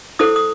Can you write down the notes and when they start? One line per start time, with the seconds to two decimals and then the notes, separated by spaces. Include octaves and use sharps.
0.19 E4 A4 C5 D#6
0.36 D#6